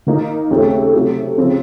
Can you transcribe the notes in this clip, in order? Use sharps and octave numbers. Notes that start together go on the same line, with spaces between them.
D#3 A#3 D#4
D#2 C#3 A3 C4
C3 F#3 A3
C#3 F3 C4